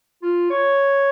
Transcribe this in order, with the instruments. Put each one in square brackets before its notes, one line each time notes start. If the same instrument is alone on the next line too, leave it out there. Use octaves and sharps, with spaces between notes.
[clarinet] F4
C#5